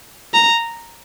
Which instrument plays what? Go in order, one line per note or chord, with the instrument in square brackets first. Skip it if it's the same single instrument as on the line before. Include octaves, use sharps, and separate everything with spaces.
[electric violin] A#5